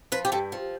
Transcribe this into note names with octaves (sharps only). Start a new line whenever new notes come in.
F3 B4
G4
G2 A4
F3